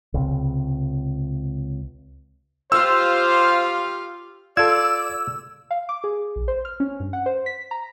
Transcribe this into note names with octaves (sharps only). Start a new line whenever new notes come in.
C#2 C3
F4 G4 C5 F5 E6
F4 A4 D5 E6 G#6
F5
D6
G#4
A#1
C5
F6
C#4
G2
F#5
C5
B6
A#5